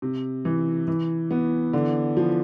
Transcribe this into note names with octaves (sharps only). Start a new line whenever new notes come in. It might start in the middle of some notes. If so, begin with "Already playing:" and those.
C3
E3
E3
B3
D3
F3